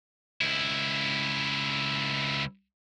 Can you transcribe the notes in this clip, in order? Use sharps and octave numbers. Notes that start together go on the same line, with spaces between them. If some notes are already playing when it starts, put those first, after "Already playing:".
C#2 E4